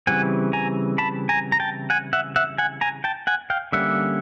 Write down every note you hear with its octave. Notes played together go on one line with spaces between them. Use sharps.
C#3 E3 G3 C4 F#5 G#5
G#5 A#5
A5 B5
G#5 A#5
A#5
G5 A5
F#5 G#5
E5 F#5
E5 F#5
F#5 G#5
G#5 A#5
G5 A5
F#5 G#5
F5 G5
D3 G3 A#3 C#4 E5 F#5